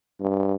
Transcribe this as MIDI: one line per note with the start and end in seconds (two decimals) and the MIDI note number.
0.20 0.55 43